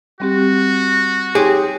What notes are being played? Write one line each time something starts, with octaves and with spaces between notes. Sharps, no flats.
G3 C4 F#4 G4
D#4 G4 G#4 C#5 C6